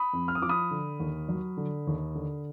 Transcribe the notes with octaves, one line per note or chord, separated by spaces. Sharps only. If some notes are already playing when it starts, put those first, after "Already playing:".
Already playing: B5 D#6
F2
F6
D#6
F3 D6
B5 D#6
D3
D#2
F#3
D3
D#2
D3